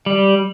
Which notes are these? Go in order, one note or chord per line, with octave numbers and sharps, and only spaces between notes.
G3